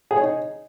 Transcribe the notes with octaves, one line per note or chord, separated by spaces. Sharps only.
G#4
C#5
D#4